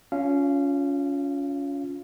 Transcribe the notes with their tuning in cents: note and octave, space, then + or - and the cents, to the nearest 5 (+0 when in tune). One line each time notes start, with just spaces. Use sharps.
C#4 +25 F4 +20 F5 -20